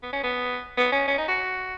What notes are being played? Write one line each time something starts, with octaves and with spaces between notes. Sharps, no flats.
B3
C#4
B3
B3
C#4
C#4
D#4
F#4